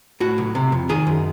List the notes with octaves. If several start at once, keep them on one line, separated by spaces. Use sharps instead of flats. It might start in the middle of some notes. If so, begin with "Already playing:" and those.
A2 F#4
B1
C3
F2
D#3 G#4
F#2